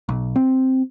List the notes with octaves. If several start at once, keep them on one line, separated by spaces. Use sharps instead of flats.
B1
C4